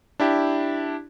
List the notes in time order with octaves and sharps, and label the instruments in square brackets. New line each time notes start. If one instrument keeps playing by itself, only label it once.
[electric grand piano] D4 E4 G4